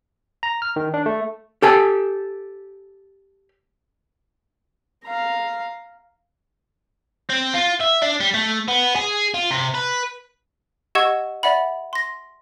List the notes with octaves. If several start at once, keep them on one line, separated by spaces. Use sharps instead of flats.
A#5
F6
D#3
D4
A3
G4 A4 G#5
F5 A#5
C4
F4
E5
D4
G3
A3
B3
G#4
F4
C3
B4
G4 D#5 F#5 C#6 E6 G#6
D5 E5 F#5 B5
C6 A#6